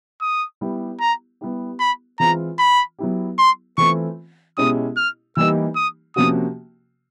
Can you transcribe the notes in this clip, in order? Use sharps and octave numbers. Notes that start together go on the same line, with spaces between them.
D#6
G3 B3 E4 G4
A#5
G3 B3 E4 G4
B5
E3 G#3 C4 F4 A#5
B5
F#3 B3 E4 G4
C6
E3 A3 C4 F4 C#6
B2 G#3 C#4 E4 G4 D#6
F6
E3 G3 A#3 D#4 G4 E6
D#6
C3 F3 A#3 C#4 F#4 D#6